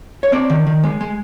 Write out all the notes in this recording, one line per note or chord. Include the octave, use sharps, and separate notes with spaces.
C#5
C4 D5
D#3
D#3
G#3
G#3